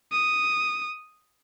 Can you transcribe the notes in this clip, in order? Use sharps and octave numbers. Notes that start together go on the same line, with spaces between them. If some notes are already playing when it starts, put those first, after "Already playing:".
D#6